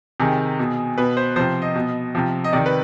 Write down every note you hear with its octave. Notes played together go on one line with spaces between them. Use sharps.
C3 D#3 G#4
B2
B2 B4
C5
C3 F3 C5
D#5
B2
C3 F3
D#5
C3 D#3 D5
B4